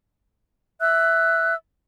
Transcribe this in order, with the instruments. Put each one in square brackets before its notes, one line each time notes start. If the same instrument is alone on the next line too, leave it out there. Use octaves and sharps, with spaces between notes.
[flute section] E5 E6 F#6